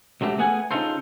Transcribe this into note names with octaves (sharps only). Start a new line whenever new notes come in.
C#2 F#3 A3 G4
A3 B3 G#4 F#5 G#5
C#3 E3 D#4 F4 A4 C5